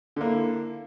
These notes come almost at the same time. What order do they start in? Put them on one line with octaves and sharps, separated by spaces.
D3 A#3 E4